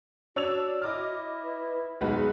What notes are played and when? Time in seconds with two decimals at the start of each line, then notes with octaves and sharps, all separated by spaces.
0.36 D4 F#4 C#5 E6 F7
0.82 E4 D#5 D6 F6
1.44 B4
2.01 F#1 B1 G#3 D#4 F#4 G#4 B4